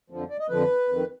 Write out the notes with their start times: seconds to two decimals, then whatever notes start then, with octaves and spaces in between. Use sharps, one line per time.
0.10 F2 D3 F3
0.30 D5
0.40 D#5
0.49 F2 D3 F3 B4
0.89 F2 D#3